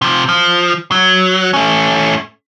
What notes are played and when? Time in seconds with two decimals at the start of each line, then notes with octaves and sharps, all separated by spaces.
0.02 C3 F3
0.29 F3
0.92 F#3
1.54 A3 C#4